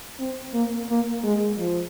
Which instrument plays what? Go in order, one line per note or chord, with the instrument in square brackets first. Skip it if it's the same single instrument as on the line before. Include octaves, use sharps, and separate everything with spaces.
[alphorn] C4
A#3
A#3
G#3
F3